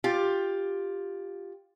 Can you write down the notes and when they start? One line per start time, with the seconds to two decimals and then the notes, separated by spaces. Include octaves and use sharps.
0.04 F4 G4